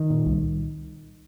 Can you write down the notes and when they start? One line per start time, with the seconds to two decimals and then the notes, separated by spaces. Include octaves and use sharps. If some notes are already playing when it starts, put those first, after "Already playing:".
Already playing: D#3
0.10 A#2
0.26 C2